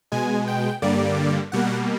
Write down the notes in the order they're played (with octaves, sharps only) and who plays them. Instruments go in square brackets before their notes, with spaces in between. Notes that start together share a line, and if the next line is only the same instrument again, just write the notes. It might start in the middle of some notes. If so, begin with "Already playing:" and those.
[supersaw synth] B2 G#3 G#5
G5
G2 D3 G3 A#3 D5
B2 G3 A#3 F#5